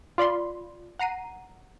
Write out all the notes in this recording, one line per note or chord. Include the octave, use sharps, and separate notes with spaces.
F4 D5 B5 C6
F#5 A#5 C7 D#7